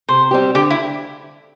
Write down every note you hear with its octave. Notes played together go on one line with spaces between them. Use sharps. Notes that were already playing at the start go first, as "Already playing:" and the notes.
C3 C5
G3 C4 G4
D3 G4
E4